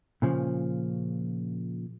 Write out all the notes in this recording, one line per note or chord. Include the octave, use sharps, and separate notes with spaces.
A#2 C#3 F3